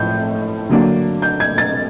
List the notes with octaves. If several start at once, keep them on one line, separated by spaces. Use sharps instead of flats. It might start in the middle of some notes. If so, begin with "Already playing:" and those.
Already playing: A2 F3 A3 G6
D3 F#3 A#3 D4
G6
G#6
A6